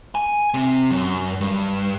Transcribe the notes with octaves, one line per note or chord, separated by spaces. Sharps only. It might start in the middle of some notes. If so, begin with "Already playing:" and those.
G#5
C3
F#2
G2